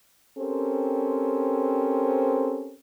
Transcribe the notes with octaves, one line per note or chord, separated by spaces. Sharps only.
C4 C#4 G4 A4 A#4 C5